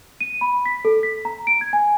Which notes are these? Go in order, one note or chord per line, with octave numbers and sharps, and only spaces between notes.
D#7
B5
B6
A4
B6
A#5
D7
G#6
G#5